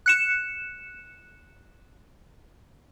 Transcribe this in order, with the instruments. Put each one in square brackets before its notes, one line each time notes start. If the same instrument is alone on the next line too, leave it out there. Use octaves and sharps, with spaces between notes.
[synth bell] F#6 C#7 E7